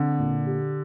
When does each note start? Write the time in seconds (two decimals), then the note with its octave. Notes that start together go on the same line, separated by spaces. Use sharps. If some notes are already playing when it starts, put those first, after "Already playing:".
Already playing: D3 C4
0.19 A#2
0.46 G4